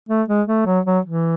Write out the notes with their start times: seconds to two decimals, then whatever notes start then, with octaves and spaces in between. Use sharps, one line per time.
0.09 A3
0.28 G#3
0.48 A3
0.66 F#3
0.86 F#3
1.06 E3